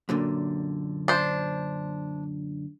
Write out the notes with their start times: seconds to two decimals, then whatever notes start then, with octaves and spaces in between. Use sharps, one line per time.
0.09 F#2 A#2 D3
1.08 D4 C5